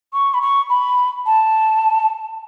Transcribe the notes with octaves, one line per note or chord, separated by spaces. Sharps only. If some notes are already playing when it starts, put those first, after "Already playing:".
C#6
B5
C#6
B5
A5